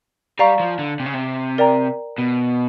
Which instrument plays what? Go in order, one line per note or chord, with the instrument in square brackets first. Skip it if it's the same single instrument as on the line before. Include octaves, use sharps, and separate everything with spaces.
[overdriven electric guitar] G3 [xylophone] D5 F5 A#5 C#6
[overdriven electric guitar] F3
D3
C3
C#3
C3
[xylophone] A#4 D5 G5 A#5
[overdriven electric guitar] B2